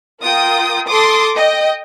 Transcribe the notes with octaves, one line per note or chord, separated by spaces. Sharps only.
F4 A#4 G5 D#6
A4 C6 D6 D#6
D#5 G5